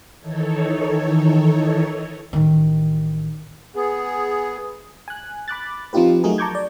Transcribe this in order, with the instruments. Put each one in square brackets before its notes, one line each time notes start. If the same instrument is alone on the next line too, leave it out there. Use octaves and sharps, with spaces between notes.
[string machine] D#3 E3 D#4 A4 C#5
[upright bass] A1 D#3
[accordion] B3 G#4
[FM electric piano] G#5 F#6
B5 D6 F#6 A6
F3 C4 D#4 F4 G4 B4
F#3 A3 D#4 F#4 G#4 A#4
A5 A#5 C#6 D6 G6 G#6
D5